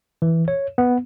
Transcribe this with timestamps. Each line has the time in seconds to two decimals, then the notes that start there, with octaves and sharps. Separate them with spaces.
0.22 E3
0.48 C#5
0.78 B3